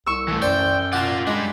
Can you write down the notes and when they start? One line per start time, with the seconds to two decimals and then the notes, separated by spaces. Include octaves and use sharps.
0.06 C2 C#6 E6
0.28 E3 A3
0.42 F#2 C5 D5 G5
0.93 F4 D5 F#5 A5
1.27 G3 G#3 D4